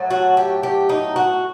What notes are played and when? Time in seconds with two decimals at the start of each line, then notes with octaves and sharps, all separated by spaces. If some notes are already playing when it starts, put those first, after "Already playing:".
Already playing: A2 F#3 A3
0.10 F#4
0.37 G4
0.63 G4
0.89 D#4
1.16 F#4